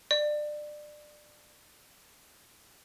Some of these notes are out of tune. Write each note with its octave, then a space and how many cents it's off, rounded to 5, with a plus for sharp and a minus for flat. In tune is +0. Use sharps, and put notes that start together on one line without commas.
D5 +25